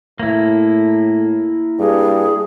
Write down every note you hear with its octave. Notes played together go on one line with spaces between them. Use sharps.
A2 A#3 E4
G2 G#4